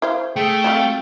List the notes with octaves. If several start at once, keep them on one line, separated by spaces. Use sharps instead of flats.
E4 C5 F5
A3 G#4 G5
F#3 C4 F4 F5